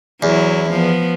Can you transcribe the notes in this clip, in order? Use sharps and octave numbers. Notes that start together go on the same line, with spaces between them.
E2 F#3 E4
F3 B3